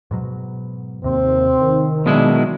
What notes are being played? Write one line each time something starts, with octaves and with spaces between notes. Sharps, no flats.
G#2 B2 F#3
D#2 C3 C4
D#3
B2 F#3 G#3 D4 E4